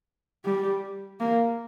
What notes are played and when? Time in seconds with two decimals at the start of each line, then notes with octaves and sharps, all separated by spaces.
0.44 G3
1.20 A#3